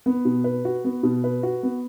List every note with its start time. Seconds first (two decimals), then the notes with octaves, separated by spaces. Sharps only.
0.06 B3
0.25 B2
0.44 B4
0.65 F#4
0.84 B3
1.03 B2
1.24 B4
1.43 F#4
1.63 B3